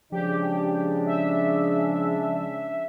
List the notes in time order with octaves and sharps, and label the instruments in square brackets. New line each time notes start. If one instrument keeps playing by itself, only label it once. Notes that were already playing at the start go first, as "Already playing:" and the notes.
[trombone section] C#3 G#3 D4 [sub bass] F3 [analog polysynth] G4
[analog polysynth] E5